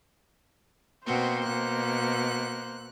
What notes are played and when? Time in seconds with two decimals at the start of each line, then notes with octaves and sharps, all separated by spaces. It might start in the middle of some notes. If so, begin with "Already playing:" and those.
1.06 B2 A#3 C4 F#4 C5
1.44 B2 F#6